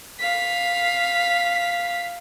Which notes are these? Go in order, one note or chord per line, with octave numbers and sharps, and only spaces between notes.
F5 B6